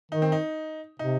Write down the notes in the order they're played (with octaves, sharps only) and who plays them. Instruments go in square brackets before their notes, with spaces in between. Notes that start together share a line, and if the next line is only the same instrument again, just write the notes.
[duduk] D#3 [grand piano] D#4
[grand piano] C4
D#4
[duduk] C3 [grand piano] D#4